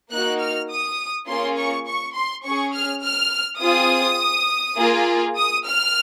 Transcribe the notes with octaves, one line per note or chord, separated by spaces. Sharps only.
A#3 D#4 F#4 F#6
F6
D#6
A#3 C#4 F4 G#4 C6
C#6
C#6
C6
C#4 G#4 C#6
F6
F6
C4 F4 G#4 D#6
A#3 F4 G#4
D#6
F6